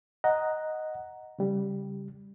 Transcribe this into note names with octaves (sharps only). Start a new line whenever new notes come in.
D#5 F#5 A#5
C#3 G3